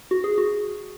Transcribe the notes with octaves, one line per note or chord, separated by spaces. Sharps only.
F#4
G#4
F#4